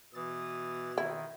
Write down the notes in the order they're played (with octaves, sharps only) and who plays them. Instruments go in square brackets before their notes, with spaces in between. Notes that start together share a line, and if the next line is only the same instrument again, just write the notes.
[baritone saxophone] B2 [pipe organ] E3 A6 [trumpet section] D#6
[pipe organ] D#3 [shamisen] E4